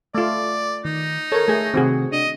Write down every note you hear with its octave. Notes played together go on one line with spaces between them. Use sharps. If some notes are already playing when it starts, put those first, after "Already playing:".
A3 F4 D5
D#3 D#4
A4 A#4 C#5
A3 G#4
C3 D#3 C4 F#4 G#4
D4 D#5